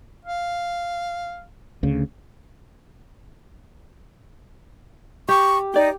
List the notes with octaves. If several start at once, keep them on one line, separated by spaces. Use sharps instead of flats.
F5
D2 C#3
G4 C#6
D#4 G4 D5